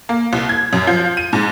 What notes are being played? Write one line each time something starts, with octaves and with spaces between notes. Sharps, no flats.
A#3
C2
G#6
F#2
F3
D#7
G#2